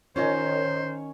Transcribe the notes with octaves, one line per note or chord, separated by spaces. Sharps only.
D#3 C#4 F4 C5 C#5 D#5 G#5